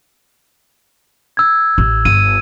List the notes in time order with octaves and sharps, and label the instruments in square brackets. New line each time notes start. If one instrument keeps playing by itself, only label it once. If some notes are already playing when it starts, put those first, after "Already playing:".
[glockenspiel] E6 G#6
[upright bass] A1
[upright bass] G1 [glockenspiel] D#7